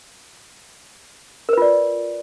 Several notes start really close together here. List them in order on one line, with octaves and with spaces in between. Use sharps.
A#4 B4 F4 D5